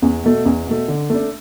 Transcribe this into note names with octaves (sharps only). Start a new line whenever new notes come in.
E2
B2 A3
E2
B2 A3
D3
A3 D4